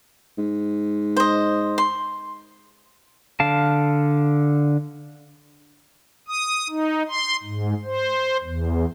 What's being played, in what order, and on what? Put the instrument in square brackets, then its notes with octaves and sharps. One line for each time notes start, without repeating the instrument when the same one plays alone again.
[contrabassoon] G#2
[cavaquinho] C5 D#5
C6
[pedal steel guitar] D3 F5 A5
[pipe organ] D#6
D#4
C6
G#2
C5
E2